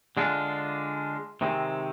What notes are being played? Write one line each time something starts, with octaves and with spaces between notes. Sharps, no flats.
D3 G#3 D4 F4
C3 D#3 G#3 C4